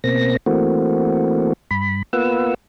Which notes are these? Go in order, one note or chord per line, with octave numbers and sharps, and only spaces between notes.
B2 A#3 C4 A#6
E3 A3 A#3 C4 F#4
G2 B5
A#3 B3 F4 B4 F#5 E6